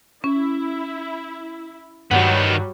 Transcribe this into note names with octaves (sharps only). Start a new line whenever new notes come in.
C#4 E4
G2 D#3 F#3 G3 B3 F#5